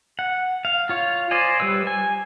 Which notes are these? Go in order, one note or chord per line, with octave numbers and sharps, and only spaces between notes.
F#5
F5
F4 C#5
C5 D5 D#5 G#5
G3 B4 C#5 E6
G#5